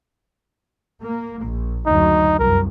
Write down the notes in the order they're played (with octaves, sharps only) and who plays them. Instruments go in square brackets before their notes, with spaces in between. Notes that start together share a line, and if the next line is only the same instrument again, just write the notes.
[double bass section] A#3
A#1
[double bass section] F#1 D2 F#3 [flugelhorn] D#4
[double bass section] C2 F#2 [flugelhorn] A#4